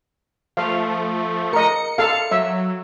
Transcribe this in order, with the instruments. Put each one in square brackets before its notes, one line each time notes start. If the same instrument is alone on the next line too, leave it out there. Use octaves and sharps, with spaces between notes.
[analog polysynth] F3 A3 [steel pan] F5
[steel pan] A#4 D#5 [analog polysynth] C#7
[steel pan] A4 F5
[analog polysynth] F#3 [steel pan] E5